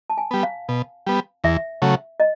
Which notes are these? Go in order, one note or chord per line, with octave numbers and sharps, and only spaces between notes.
A5
G#5
G3 B3
F5
B2
G3 B3
E2 E5
C#3 F#3 A3
D#5